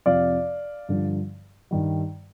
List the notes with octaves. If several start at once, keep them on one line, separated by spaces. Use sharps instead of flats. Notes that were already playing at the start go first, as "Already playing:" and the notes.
F2 C3 F3 D5 F5
G2 D3 F3
G2 D#3 G3